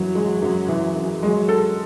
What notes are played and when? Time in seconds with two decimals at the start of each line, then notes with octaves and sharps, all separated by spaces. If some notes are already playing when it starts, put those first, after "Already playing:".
Already playing: F#2 E3 F#3
0.15 G#3
0.42 F#2
0.68 E3
0.95 F#2
1.22 F#3 G#3
1.49 A4